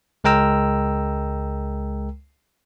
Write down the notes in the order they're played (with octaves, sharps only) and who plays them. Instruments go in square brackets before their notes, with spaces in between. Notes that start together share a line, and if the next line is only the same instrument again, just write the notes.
[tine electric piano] C#2 G#3 A#4 G5 A#5 E6